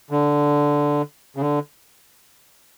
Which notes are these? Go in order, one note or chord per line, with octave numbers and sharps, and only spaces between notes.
D3
C#3
D3